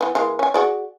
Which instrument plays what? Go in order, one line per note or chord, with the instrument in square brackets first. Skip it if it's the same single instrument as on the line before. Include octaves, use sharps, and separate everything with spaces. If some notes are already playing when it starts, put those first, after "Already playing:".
[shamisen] E3 B3
E3 G#3 A#3
C#4 G#5
F#4 G#4 D5